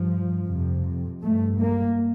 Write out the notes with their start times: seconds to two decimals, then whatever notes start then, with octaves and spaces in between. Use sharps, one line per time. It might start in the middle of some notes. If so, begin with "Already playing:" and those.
Already playing: G2 F3
0.47 F2 C3
1.22 G2 A3
1.59 A#3